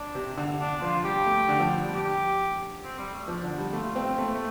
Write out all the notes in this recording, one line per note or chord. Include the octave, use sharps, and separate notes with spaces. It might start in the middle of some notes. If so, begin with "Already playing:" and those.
Already playing: D4
C3
D3
D4
F3 F4
G3 G4
A3
D3
F3
G3
G3
G4
C4
G3
A3
F3 D4
D3
G3
A3 F4
C4
A3
A3